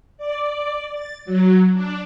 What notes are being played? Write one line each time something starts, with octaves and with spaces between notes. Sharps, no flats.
D5
A6
F#3
D4